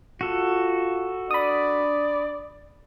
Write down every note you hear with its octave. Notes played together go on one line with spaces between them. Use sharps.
F4 F#4 A4
D4 D5 B5 D#6